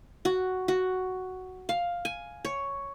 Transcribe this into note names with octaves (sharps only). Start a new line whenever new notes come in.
F#4
F#4
F5
G#5
C#5